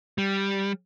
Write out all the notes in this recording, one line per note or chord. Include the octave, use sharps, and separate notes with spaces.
G3